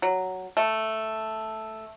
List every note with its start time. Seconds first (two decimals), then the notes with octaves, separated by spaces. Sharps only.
0.02 F#3
0.57 A3